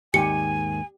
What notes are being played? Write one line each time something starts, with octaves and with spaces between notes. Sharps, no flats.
D#2 G#2 D#3 G4 G#5 C#7